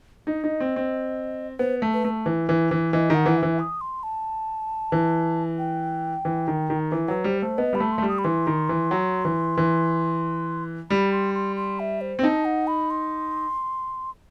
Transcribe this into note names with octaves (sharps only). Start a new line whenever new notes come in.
D#4 D#5
D#4
C4
C4
B3 C5
A3
B4
A3
E3
E3
E3
E3 D#5
D#3 F#5
E3
E5
E3
D#6
C6
A5
E3
G5
E3
D#3
D#3
E3
F#3 B4
G3 C5
A3 C5
B3 D#5
G3 B5
A3
C6
A3
G3
D#6
B5
E3 C6
D#3
E3
F#3
E3
E3
G3 B5
C6
C6
C6
E5
C5
C4
D#4 A5
F#5
B5
C6